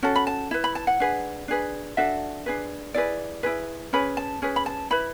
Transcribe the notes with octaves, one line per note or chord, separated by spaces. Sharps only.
C#4 F#4 A4
B5
A5
E4 B4
B5
A5
F#5
D4 G#4 B4
D4 G#4 B4
D4 F#4 A4 E5
D4 G#4 B4
E4 G#4 B4 D5
E4 G#4 B4
C#4 G#4 B4 B5
A5
C#4 G#4 B4
B5
A5
E4 B4 B5